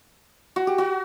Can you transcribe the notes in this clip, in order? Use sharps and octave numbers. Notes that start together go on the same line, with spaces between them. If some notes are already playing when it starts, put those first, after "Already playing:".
F#4
G4
F#4